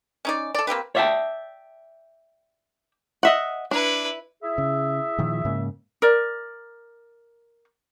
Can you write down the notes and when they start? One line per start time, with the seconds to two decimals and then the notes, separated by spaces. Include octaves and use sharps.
0.25 C#4 D#4 D5
0.55 A4 D5
0.67 A#3 C4 G4 B4
0.95 C#5 D5 E5 F5 G5 A5
3.23 D#5 E5 F#5
3.71 D4 E4 B4
4.43 E4 G#4 E5
4.58 C#3
5.18 A#2 D#3 F3
5.45 G#2 C#3 A#3
6.02 A#4 D5